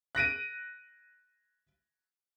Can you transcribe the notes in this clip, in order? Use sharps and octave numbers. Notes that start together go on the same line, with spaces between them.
F#6 A#6 D7 D#7